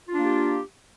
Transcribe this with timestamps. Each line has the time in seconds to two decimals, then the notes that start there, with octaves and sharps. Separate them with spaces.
0.09 F4
0.14 D4
0.18 A#3
0.23 G4